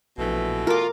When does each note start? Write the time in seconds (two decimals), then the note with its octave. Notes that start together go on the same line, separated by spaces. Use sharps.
0.18 A#1 B2 E3 A3
0.67 F4 A#4 D6